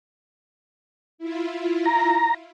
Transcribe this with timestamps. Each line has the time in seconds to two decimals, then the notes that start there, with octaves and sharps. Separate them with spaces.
1.18 E4 F4
1.86 A#5